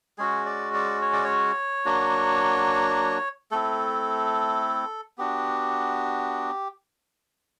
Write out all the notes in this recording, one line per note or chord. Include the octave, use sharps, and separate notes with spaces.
G#3 C#4 F#4 G#4
D5
D5
C#5
D5
C#5
F#3 A#3 D4 F#4
A3 C4 E4 A4
B3 D4 F#4 G4